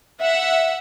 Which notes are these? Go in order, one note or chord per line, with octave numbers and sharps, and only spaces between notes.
E5 F#5